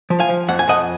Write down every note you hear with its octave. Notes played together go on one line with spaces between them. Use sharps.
F3
F5 G#5
F3
F2 F#5
G#5
F2 D#5 F#5